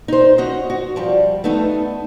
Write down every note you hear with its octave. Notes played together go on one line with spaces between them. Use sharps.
D#4 C5
C#4 F#4 D#5
F#4
F3 G3
A3 B3 D#4 A4